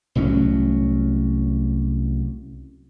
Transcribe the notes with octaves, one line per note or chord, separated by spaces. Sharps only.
C2 A2 F#3 C#4